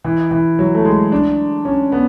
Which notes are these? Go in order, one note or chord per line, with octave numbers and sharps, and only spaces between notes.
E3
E3
F#3
A3
G#3
D4
C#4
B3